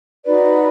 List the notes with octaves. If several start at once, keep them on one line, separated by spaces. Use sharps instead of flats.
D#4 F#4 B4 D5